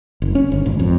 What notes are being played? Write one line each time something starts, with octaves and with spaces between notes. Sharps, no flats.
F#1
C#4
G1
G#1
F2